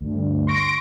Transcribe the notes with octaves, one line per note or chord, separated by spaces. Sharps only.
D2 G2
C6 C#6 A#6 D7